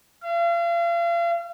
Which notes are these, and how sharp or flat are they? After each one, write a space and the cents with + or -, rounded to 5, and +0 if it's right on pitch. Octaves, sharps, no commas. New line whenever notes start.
F5 -40